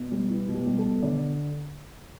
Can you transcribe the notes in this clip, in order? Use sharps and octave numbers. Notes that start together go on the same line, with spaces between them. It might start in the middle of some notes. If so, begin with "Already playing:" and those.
Already playing: B2
G3
B3 E4
B2
G4
G3
A4
B2
D3 D5